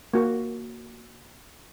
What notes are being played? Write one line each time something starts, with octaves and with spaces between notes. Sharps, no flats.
A#3 F#4